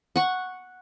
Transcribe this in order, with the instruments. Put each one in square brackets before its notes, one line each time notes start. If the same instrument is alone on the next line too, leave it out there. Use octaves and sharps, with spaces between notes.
[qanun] F#5 C#6